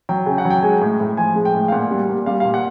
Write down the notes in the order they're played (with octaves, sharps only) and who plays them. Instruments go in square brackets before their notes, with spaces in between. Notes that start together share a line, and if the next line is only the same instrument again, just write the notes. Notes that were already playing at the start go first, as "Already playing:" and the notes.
[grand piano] F#3 G5
C#3
F#5
F#3
G5
G#3 G#5
A2
A2
F3 G#5
G#3
G5
A2
F5
A#2 F#5
G3
A#2
G3 F5
F5
A#2
F#5